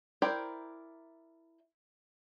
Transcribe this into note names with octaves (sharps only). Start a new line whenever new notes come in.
E4 A#4 C5 D5 G5